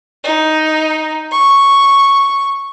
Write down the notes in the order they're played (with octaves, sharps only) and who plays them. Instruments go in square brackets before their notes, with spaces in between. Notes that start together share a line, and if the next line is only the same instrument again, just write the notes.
[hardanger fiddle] D#4
C#6